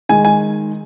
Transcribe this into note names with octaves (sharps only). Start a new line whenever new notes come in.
D#3 G#3 D#4 G#5
G#5